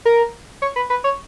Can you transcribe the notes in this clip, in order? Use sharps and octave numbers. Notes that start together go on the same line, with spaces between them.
A#4
C#5
B4
B4
C#5